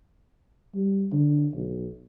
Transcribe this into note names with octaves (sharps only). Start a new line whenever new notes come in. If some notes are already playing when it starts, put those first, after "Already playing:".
G3
D3
B1